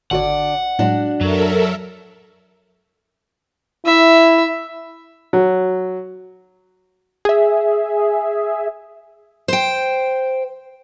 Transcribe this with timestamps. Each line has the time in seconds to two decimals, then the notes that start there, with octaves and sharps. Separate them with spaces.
0.11 G#1 D3 F#4 D5 F#5
0.79 A2 F#3 G#3 D4 F#4
1.21 F#2 F#3 A4 A#4 E5
3.86 E4 E5
5.33 F#3
7.25 G#4 E5
9.48 C5 G5